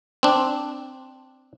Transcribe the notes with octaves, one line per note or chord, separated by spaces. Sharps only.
C4 D4